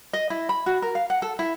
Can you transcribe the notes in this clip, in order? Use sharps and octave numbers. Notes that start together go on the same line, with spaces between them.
D#5
E4
B5
F#4
A#4
F5
F#5
A4
E4